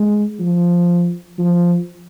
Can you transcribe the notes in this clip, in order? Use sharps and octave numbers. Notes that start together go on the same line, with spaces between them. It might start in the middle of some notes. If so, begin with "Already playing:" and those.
Already playing: G#3
F3
F3